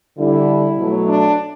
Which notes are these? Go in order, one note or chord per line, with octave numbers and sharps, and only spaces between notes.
D3 G3 E4
B2 F#3 A3
D4